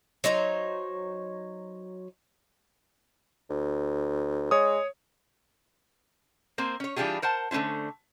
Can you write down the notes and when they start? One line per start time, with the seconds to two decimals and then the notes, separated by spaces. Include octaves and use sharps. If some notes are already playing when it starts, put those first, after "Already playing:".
0.24 F#3 D#4 C5 C#5
3.50 D2
4.51 G#3 C#5 D#6
6.58 A#3 C4 C5
6.80 C#4 C#5
6.96 E3 G3 D4 F4 G4 G#4
7.22 A#4 C5 F#5 A5
7.51 D3 A3 C#4 E4 C5